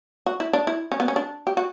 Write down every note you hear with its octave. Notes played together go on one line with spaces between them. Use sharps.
F#4
E4
D4
E4
C#4
B3
C#4
D4
G4
F#4